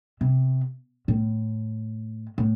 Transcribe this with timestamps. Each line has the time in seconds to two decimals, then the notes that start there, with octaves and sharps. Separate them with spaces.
0.21 C3
1.08 A2
2.38 A2